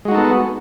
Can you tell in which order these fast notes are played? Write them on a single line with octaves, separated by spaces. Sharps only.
G#3 F#4 D#4 A4 B3